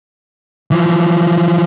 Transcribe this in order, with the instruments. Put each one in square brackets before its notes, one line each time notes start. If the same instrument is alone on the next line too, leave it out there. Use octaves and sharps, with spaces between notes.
[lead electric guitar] E3 F3